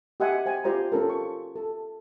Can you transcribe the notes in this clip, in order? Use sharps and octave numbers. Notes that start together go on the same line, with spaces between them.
G4 D#5 E5 F#5 G#5 C6
C5 G5 G#5
F4 G4 C5 D5 A#5
C#4 F4 A4 A#4
C#6
A4